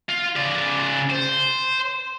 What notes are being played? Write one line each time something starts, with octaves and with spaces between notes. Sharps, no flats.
F4
C#3 D5
C5